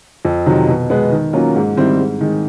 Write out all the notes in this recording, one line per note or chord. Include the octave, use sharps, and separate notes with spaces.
F2
C3 D#3 F#3
B2
G#3 B3
D#3
F#3 A#3 C#4 F4
G#2
D#3 G3 C4 E4
G#2
D#3 G#3